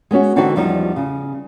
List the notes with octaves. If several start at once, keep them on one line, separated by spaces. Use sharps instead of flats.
G#3 B3 C#4 F#4
D3 E3 C4 D4 D#4 F#4
E2 F3 G3 D#4
C#3